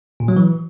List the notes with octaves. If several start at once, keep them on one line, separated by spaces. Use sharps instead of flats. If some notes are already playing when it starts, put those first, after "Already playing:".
A#2
F#3
E3